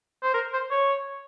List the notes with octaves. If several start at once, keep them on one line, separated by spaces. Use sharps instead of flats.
C5
A#4
C5
C#5